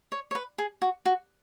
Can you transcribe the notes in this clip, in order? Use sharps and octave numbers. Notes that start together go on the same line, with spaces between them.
C#5
C#5
B4
G#4
F#4
F#4